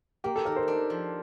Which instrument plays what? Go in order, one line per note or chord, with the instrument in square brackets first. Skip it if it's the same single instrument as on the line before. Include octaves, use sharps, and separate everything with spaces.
[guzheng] A#3 [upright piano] G4
[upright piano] A4
[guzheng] D#3 [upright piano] A#4
[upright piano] C5
[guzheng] D4
F3